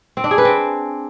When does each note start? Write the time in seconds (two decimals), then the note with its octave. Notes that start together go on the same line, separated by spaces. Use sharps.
0.17 C4
0.24 D4
0.31 G#4
0.38 B4
0.45 C4